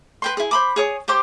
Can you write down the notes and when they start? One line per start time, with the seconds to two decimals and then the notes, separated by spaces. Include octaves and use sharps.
0.22 B4 G5 C6
0.37 E4 G#4
0.51 C5 B5 D6
0.76 G#4 C#5 D#6
1.08 G4 C5 C6 D6